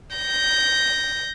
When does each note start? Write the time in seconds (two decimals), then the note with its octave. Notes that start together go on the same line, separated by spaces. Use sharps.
0.16 G6 A#6